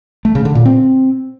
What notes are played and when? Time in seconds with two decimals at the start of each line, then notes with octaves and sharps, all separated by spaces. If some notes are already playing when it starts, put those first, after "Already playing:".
0.25 A3
0.35 C#3
0.45 D3
0.55 A#2
0.65 C4